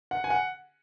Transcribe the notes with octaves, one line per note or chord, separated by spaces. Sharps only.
F#5
G#5
F#5